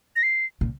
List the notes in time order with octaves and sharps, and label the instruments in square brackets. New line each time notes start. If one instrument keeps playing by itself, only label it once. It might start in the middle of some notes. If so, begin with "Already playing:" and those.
[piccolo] A#6
C7
[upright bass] A#2